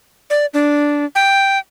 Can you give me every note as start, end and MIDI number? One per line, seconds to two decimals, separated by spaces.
0.30 0.46 74
0.54 1.05 62
1.15 1.58 79